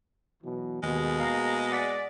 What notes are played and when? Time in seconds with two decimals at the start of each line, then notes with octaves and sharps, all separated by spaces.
0.43 B2 E3 F#3
0.83 D#2 B2 G#3 A#3 G#4
1.20 F5 A#5
1.72 D5 F#5 A6 B6